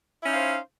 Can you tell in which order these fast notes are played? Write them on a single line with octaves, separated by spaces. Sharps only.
E4 C#4 D#4 F5 C5